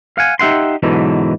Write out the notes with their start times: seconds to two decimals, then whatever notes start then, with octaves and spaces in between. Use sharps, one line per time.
0.18 F5 F#5 G#5
0.39 D#4 G4 E5 F#5 C6
0.83 G#2 B2 D3 E3 F#3